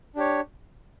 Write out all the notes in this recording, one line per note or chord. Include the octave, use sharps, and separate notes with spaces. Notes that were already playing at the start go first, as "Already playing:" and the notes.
D4 G4 C#5